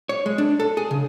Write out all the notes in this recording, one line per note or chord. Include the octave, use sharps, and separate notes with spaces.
C#5
G#3
D4
A4
G#4
C#3